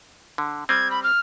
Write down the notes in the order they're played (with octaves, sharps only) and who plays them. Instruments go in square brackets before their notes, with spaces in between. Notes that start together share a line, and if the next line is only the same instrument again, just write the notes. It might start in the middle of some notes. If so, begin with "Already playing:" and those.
[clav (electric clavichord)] D3
[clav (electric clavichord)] G3 C4 [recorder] G#6
[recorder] B5
F6